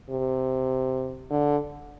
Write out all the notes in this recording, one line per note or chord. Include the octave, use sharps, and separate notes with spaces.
C3
D3